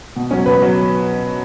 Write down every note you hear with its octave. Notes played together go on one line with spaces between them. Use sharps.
B2
F#3 C#4
B2 B4
F#3